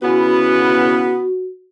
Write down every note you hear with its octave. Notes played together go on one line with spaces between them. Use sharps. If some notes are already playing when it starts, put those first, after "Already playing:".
C#3 B3 C#4 E4 F#4